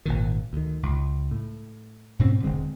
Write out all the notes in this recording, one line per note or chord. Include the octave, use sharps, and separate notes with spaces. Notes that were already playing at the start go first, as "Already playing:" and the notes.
G#1 A#2 D#3
D2 D#3
C#2
A2
G#2 B2 C4 C#4
E1 D3 G#3 C4